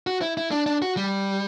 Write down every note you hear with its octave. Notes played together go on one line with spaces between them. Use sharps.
F#4
E4
E4
D4
D4
F#4
G3